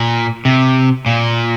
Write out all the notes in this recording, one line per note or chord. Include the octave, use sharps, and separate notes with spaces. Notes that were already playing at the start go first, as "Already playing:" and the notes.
Already playing: A#2
C3
A#2